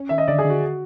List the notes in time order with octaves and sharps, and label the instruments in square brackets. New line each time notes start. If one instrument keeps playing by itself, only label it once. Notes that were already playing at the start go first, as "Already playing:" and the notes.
Already playing: [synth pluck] C#4
[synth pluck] D#3 [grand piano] E5
[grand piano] D#5
[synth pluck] D3 [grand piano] D5
[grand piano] G#4
[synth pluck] D3
[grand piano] F#4